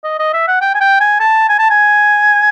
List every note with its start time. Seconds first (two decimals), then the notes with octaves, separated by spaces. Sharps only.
0.04 D#5
0.19 D#5
0.34 E5
0.48 F#5
0.61 G5
0.75 G#5
0.81 G5
1.01 G#5
1.20 A5
1.49 G#5
1.59 A5
1.71 G#5